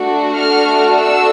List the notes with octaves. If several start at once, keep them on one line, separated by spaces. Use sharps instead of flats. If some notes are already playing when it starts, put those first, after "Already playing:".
Already playing: A3 D4 F#4 A4
F6
E6